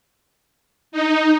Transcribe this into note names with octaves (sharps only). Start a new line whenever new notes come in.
D#4